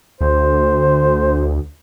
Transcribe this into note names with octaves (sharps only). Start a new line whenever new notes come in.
D2 C5